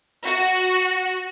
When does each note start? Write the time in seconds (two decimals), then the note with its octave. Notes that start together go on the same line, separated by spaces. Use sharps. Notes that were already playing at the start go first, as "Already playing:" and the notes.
0.25 F#4